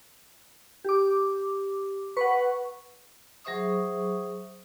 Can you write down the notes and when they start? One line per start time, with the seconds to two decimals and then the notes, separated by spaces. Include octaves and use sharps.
0.84 G4 D6
2.17 B4 F#5 C#6
3.44 F#3 G#4 C5 E5 C#6 D#6